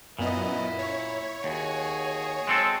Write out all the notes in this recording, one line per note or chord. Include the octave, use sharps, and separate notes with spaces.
F#2 A#2 B3 E4 D#5
C#5
D#2 F#4 G#4
G#3 C4 A4